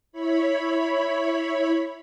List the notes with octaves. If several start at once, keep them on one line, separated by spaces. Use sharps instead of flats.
E4 C#5 B5